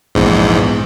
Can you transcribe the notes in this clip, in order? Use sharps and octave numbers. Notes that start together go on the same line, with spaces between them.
A#1 E2 G#2